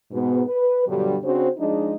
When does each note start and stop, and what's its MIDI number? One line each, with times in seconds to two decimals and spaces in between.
0.11 0.42 44
0.11 0.42 47
0.11 0.42 59
0.47 0.85 71
0.87 1.16 43
0.87 1.16 47
0.87 1.16 50
0.87 1.16 54
0.87 1.16 55
1.24 1.48 49
1.24 1.48 60
1.24 1.48 62
1.24 1.48 66
1.24 1.48 72
1.58 1.95 53
1.58 1.95 56
1.58 1.95 62
1.58 1.95 63
1.58 1.95 68
1.58 1.95 75